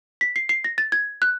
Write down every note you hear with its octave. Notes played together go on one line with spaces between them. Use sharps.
B6
C7
C7
A#6
A6
G#6
F#6